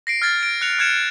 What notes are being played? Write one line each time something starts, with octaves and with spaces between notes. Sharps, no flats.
A#6 C7 D7
F6 G#6 A6
D7
F#6 C#7 F7
F6 F#6 G#6 C#7 E7